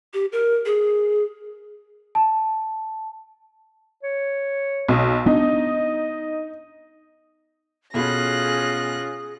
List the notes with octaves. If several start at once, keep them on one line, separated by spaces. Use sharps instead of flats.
G4
A#4
G#4
A5
C#5
B1
B3 D4 D#4 D#5
B2 C#4 F4 G#4 A4 B5 F#6 A#6